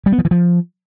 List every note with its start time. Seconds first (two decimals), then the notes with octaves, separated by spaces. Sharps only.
0.06 G3
0.12 B3
0.19 F3
0.25 E3
0.31 F3